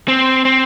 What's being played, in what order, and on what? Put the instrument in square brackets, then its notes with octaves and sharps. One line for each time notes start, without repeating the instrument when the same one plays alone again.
[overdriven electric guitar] C4
C4